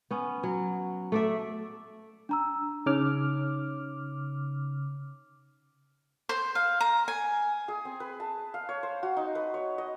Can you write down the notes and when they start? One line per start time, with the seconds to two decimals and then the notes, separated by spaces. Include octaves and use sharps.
0.11 B3 C#4
0.44 F#3
1.12 A3 D5 E5
2.29 D4 A#5 E6
2.86 C#3 D#4 C#5 D6 F6
6.29 C5
6.55 F5
6.80 A#5
7.08 G#5
7.68 G#4
7.85 C4
8.00 B4
8.20 A5
8.54 F5
8.69 C#5
8.83 C5
9.03 F#4
9.17 D#4
9.35 B4
9.54 C#5
9.78 D#5